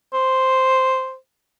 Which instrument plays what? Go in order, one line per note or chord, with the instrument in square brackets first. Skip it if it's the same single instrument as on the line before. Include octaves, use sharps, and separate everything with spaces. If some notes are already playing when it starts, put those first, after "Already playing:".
[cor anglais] C5